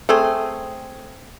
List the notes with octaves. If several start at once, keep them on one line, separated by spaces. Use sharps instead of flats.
A3 C4 G#4